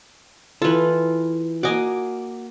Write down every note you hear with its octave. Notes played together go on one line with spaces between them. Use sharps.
E3 F4 A4 B4
A#3 F#4 D#5 G#5 D6